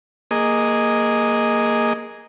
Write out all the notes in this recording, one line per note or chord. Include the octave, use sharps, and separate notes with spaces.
A#3 G#4 D#5